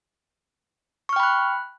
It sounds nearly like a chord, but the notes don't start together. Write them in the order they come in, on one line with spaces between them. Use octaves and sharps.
C#6 F6 G5 B5 F#6